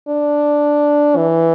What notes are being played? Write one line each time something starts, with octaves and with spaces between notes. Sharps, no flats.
D4
E3